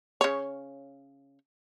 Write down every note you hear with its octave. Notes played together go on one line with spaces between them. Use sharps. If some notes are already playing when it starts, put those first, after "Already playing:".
C#3 C#5